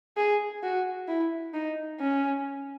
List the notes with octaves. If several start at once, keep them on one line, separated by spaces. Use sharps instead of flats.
G#4
F#4
E4
D#4
C#4